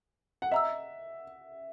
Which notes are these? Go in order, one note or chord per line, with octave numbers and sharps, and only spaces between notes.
F#5
D#5 E5 A#5 E6